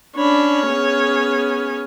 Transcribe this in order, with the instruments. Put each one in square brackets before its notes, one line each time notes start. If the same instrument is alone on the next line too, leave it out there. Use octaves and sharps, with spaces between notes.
[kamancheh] C#4 C#5 [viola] D4 B5
[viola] B3 G#4